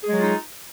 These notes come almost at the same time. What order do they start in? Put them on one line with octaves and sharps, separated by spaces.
G#4 G#3 F#3 F4 D#4